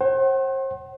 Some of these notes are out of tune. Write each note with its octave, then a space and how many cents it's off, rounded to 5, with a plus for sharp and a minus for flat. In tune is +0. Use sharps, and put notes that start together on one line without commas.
C5 +40 F#5 +40